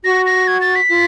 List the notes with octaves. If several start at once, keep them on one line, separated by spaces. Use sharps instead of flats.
F#4 A#6
A#6
G#6
A6
B6
F4